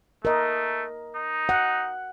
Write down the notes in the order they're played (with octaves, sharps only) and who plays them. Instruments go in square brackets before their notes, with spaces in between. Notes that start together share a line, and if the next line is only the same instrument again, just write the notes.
[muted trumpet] A3 [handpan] A#4 D#5
[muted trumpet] D#4
[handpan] F#5